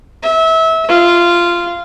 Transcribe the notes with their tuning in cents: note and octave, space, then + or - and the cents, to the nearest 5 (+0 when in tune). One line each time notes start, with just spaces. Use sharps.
E5 -25
F4 -10